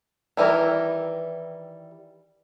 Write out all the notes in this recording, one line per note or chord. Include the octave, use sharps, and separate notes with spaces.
D#3 E3 G3 E4 A#4